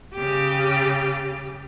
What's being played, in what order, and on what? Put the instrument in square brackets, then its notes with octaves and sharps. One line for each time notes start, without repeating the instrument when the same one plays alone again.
[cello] C#3 G4